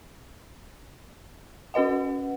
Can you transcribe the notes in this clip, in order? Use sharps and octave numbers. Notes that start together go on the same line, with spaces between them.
C#4 F#4 B4 D#5 F#5